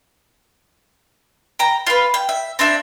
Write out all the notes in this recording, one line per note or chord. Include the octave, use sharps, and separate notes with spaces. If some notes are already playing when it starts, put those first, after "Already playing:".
G5 A#5
F4 B4
G5
E5
C4 D4 D5 E5